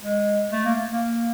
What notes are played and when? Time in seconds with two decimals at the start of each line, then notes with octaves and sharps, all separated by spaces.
0.02 G#3
0.52 A3
0.65 A#3
0.90 A#3